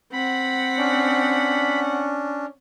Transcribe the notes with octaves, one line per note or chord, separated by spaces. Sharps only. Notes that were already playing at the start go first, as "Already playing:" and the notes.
C4 F#5 B5
C#4 D4